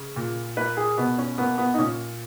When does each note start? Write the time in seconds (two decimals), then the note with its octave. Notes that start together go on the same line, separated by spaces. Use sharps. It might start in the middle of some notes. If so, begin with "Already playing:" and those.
Already playing: C#3
0.16 A#2
0.57 A#3 B4
0.77 G#4
0.98 B2 B3
1.18 C#4
1.38 A#3 B3
1.58 B3
1.74 D#4
1.78 A#2 C#4